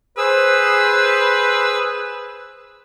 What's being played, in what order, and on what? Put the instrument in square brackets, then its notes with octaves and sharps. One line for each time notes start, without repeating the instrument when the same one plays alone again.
[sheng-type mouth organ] G#4 E6 [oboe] B4 [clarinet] C5